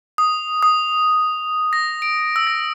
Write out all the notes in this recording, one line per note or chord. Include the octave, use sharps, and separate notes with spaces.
D#6
D#6
A#6
D7
E6
A#6